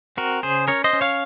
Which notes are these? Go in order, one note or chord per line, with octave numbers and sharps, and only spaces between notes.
C4 F#4 A#4
C#3 G#4 C5
C#4 A#4 C#5
C5 D#5
C#4
C#5 F5